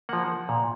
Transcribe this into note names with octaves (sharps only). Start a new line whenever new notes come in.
F3 A#3 F#5
A#2